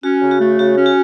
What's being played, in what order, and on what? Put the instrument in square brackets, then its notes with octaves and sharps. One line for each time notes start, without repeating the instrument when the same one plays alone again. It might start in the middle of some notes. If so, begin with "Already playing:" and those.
[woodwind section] C#4 [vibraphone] F#4
[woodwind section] C#3
[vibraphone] F#4
[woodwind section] A3
[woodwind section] C#3 [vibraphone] F#4
[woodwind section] C#4
[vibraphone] F#4